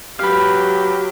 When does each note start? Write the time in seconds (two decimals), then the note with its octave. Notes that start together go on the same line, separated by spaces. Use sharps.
0.19 F#3 G4 B4 F5